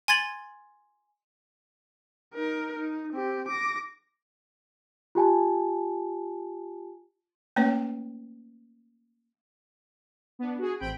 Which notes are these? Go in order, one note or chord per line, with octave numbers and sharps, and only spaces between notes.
G#5 C6 G#6 A6 F#7
D#4 A#4
D#4
C4 G4
D6 A#6
F4 G4 G#5 A5
A3 A#3 C#4 B4 C#5
B3 D4
F#4 G#4
A1 C4 G5 B5 D7